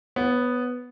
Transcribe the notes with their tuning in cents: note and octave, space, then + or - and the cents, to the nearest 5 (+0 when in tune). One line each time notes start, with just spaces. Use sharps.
B3 +0 C#5 -30